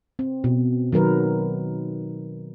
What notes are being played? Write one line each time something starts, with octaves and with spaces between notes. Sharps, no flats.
C4
B2
D#3 F#3 A#4 B4